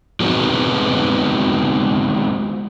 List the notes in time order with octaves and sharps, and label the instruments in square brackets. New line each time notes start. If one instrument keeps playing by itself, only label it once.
[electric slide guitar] F3 G#3 B3 C4 D#4 F#4